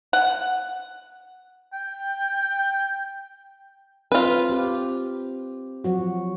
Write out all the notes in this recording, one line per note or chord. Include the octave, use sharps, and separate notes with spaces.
F#5
G5
C4 F4 B4
C4 G4
F3 F#3 F#4